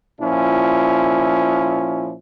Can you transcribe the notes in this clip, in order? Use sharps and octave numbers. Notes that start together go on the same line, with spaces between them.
A#2 F3 C#4 E4